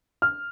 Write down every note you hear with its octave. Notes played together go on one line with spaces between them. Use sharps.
F6